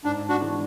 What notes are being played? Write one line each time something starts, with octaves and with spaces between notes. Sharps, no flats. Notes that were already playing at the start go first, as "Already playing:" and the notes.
G#2 D4
D4 F#4
E3 G#3 D4